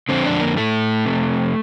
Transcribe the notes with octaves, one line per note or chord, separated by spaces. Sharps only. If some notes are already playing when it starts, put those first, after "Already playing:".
F2 D3 C4
D4
A#3
A2 A3
F2 C3